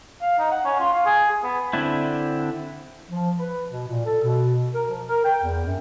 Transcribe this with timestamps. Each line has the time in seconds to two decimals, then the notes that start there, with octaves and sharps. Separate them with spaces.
0.21 F5
0.39 D#4
0.51 F#5
0.65 C#4
0.79 F4
0.93 F5
1.06 G#4
1.31 G#4
1.44 B3
1.73 D3 C4 D4 E4
3.11 F3
3.38 B4
3.69 B2
3.87 A#2
4.04 A4
4.22 B2
4.74 A#4
4.89 F3
5.07 A#4
5.23 G5
5.42 E2
5.65 F#2